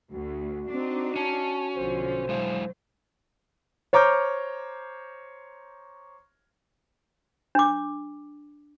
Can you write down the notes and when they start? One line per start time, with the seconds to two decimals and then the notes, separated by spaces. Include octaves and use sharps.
0.12 D2 F#4
0.72 C4 D4 D#4
1.16 C#4 A5
1.75 B1 D3 F3 C5
2.29 F#3 G#3 E4 F5
3.93 C5 C#5 A#5 D6 F6 G6
7.55 D4 D6